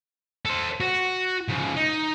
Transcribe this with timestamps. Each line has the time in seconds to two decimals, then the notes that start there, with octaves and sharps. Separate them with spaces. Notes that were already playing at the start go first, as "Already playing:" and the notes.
0.45 A4 C5
0.80 F#4
1.48 C#3 F3
1.76 D#4